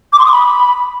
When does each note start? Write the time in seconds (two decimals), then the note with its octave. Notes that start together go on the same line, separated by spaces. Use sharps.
0.13 D6
0.19 C6
0.25 D#6
0.32 B5